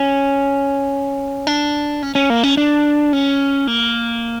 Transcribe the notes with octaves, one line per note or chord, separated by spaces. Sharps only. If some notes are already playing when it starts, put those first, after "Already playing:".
Already playing: C#4
D4
C#4
C#4
A#3
C#4
D4
C#4
A#3